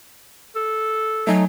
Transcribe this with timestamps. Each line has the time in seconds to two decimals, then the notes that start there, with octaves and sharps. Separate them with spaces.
0.56 A4
1.27 F#3 A3 D#4 G#5